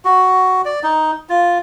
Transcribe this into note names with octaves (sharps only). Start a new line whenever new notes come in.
F#4
D5
D#4
F4